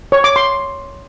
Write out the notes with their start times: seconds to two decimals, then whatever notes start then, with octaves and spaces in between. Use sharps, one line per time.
0.12 C#5
0.24 D6
0.36 C6